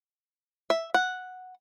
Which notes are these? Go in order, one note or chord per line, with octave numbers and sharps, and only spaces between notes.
E5
F#5